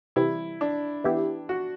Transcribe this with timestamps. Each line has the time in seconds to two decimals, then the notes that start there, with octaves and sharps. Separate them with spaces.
0.16 C3 E3 G3 E4
0.61 D4
1.04 E3 B3 E4 G4
1.49 F#4